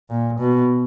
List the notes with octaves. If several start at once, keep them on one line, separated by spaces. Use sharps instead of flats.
A#2
B2